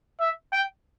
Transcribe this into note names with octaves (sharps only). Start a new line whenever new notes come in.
E5
G5